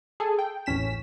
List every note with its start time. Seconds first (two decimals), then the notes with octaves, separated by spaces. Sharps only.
0.20 G#4 A4
0.39 G5
0.66 A1 E2 C#4 B6 E7